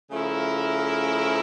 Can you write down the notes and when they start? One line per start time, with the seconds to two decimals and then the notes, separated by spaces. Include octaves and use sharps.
0.11 C#3 F3 A3 E4 A#4